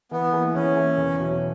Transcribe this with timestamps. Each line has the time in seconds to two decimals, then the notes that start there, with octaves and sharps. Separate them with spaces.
0.11 E3 B3
0.33 A#3 E4 G#4
0.54 E3 C#4
0.76 A#3 E4 G#4
0.98 E2
1.19 B2 F#3